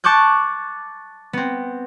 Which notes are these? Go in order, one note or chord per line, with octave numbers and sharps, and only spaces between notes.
A5 C#6 D6 F#6 G6
B3 C4